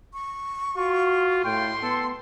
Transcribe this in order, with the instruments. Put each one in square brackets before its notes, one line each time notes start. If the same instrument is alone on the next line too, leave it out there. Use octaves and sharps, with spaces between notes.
[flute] C#6
[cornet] F4 [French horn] F#4
[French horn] A2 [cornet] G5 [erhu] C6
[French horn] B3 [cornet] A4